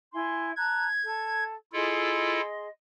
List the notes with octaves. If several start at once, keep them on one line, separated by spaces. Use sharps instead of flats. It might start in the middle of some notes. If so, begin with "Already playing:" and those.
E4 G#5 C6
A5 A#5 F#6 G#6
A4
E4 F4 G#4 A4 D#5 C6